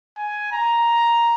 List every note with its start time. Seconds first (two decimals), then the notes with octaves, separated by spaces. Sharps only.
0.17 G#5
0.52 A#5